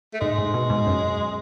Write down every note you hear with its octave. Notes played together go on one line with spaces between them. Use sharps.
A3
G#2 G#3
G#2
B2
G#2
F#2